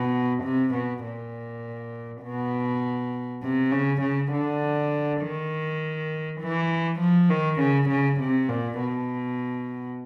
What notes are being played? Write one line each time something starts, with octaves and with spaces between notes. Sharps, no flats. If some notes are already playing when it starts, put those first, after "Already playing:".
Already playing: B2
C3
B2
A#2
B2
C3
C#3
C#3
D3
D#3
E3
F3
D#3
C#3
C#3
C3
A#2
B2